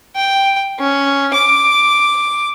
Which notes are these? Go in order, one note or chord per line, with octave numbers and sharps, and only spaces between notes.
G5
C#4
D6